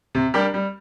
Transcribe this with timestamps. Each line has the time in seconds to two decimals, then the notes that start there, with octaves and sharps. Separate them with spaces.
0.15 C3
0.34 G3 D4 G4 A#4
0.54 G3